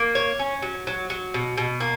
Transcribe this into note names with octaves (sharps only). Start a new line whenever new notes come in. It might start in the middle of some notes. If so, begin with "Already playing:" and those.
Already playing: A#3
C#5
C#4
F#3
F#3
F#3
B2
B2
A#3